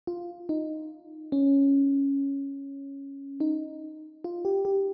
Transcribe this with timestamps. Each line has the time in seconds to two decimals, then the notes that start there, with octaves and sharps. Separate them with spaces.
0.07 F4
0.49 D#4
1.32 C#4
3.40 D#4
4.24 F4
4.45 G4
4.65 G4